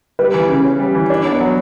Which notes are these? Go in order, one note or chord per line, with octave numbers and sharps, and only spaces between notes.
G3 B4
E3
C#3
C#4
G3
E3
D4 C#5
B3
C#5
F#3